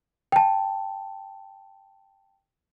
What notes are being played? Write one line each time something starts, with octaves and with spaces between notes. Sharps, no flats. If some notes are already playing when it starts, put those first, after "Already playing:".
G5 A5